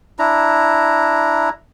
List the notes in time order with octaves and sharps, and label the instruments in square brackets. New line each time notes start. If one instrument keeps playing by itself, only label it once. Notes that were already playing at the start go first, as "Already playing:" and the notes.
[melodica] D4 E4 A#5